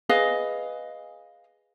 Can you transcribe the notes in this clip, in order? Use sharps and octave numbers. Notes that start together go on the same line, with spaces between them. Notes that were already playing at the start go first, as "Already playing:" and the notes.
G#4 B4 D#5 F5